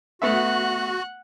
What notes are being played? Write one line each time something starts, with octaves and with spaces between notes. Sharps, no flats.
A3 B3 F#4 E5 F#5 F#6